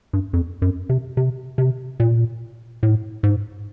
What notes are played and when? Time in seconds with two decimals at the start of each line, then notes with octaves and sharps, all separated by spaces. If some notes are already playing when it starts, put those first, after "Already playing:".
0.13 G2
0.33 F2
0.62 F#2
0.89 C3
1.17 C3
1.58 C3
2.00 A#2
2.83 A2
3.23 G#2